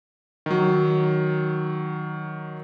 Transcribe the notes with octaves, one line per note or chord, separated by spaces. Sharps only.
D#3 F#3